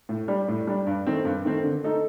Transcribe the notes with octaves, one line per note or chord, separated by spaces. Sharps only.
A2
G3 D4
A2
G3 D4
G2
D#3 A3 C4
G2
D#3 A3 C4
D3
A3 D#4 A4